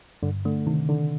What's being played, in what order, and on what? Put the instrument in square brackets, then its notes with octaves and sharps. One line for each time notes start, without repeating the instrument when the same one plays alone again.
[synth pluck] G2 [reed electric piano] D3
[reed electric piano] D3 [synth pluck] A3
[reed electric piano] C3 [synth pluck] D#3
[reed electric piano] D3 [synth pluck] D#3